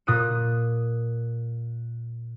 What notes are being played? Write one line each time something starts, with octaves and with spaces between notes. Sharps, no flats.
A#2 D#6 F#6 D#7